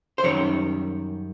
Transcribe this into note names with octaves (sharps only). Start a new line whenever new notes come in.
C5
F#2 D#3 G3 C#5